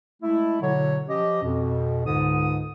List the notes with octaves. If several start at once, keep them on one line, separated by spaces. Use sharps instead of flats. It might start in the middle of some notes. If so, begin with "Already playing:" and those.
G#3 A3 E4
B2 D3 F#3 C#5
F3 C#4 G4 D#5
F2 B2
C#2 G#2 D3 D#6